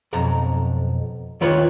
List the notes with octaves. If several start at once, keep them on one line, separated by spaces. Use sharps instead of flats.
B1 F2 A#5
D#2 D#3 F4 B4 C#5